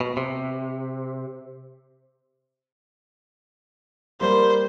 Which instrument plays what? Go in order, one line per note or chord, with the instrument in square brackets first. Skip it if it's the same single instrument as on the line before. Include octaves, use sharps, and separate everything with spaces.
[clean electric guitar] B2
C3
[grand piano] G3 A#3 [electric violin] C5